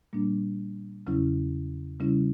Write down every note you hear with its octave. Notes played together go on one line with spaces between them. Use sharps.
A#2 G3 A#3 D4
E2 C#3 F#3 C#4 E4
C#3 G3 C#4 E4